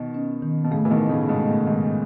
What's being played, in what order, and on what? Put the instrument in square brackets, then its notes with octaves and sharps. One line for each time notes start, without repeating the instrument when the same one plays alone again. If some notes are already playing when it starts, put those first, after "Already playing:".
Already playing: [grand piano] B2 D#3
[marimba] C#4
D#3
[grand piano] B2
[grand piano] A2 C#3 [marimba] A3
[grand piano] E3
B2 D#3
[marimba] A3
[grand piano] A2 C#3
[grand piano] G#2 B2 [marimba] A3
[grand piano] A2
[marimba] D#3
[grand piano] G#2
[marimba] C#4